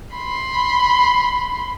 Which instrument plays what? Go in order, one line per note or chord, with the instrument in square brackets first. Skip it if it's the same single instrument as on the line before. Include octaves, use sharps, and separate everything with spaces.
[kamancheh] B5 C6